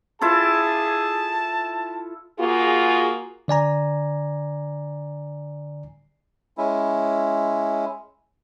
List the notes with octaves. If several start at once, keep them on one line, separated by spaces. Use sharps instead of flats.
E4 F4 G#4 A4 A5
A#3 F4 F#4 G#4
D3 D5 G#5 A#5
G#3 C#4 E4